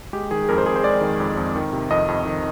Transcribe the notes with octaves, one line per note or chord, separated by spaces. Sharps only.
G#3 G4
D#3 G#4
F2 A#4
C5
F2 G#4
C5
G#3 D5
D#3
F2
F2
D#3
C3
F2 D#5
F2
D#3